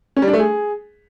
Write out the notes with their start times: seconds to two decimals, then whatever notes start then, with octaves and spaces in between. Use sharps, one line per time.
0.17 C#4
0.22 G3
0.28 D4
0.33 A3
0.39 G#4